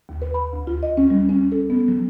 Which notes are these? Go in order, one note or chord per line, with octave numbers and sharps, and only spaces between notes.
D#2
B4
B5
D2
F4
D#5
C#4
G3
C#4
A4
B3
F#3